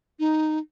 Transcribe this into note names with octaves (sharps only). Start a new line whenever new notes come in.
D#4